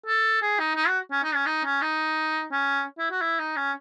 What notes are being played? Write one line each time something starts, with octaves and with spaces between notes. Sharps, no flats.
A4
G#4
D#4
D#4
F#4
C#4
D#4
C#4
D#4
C#4
D#4
C#4
E4
F#4
E4
D#4
C#4